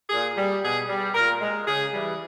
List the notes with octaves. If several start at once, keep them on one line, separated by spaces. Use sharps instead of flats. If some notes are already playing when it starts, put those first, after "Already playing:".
A#2 G#4
G3
B2 G#4
G3
A#2 A#4
G#3
C#3 G#4
E3 G3